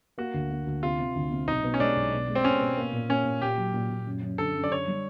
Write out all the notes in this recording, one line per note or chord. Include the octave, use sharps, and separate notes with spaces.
A#3 F#4
D2
A#3
D2
C3 F4
C3
D2
C3
B1 D#4
B2
C#4
G#3 D4
B1
B2
G#3
C4
B3 C#4
B2
A#3
A#2
A#3 C#4
A#2
A#2 G4
F#3
A#2
A#2
F#2
F#2
D3 A4
F#2
D5
D3 C#5
G3